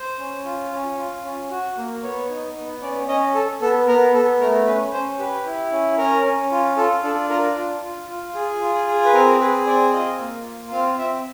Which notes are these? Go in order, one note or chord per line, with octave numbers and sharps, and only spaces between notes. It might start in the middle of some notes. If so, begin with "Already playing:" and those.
Already playing: C5
C#4
F4
C#4
F4
C#4
F#4
A#3
B3 C#5
D#4
B3
C#4 D5
C#4 D#5
A4
B3 A4
B3 A#4
B3 A4
A3 A#4
C#4 B4
C#4 C5
G4 B4
E4
C#4
C#4 A#4
C#4
F4
F4 A4
D4 A4
F4 A#4
F4
F4
F4
G#4
F4
G#4
B4
C4 A#4
G#4 B4
C4 D5
F4 D#5
A#3
F4
C4 F5
C4 E5